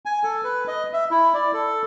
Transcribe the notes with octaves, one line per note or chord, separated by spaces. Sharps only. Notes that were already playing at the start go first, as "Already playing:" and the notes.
G#5
A4
B4
D#5
E5
E4
D5
A4